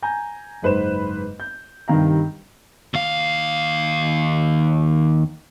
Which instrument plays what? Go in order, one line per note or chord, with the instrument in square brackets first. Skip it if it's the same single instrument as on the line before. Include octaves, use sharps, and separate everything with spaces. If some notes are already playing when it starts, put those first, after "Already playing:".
[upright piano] G#5 A#5 G6
F#1 G#2 B4 C5 E7
G6
G2 C3 D#3 F5 A#5
[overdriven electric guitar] D#2 F5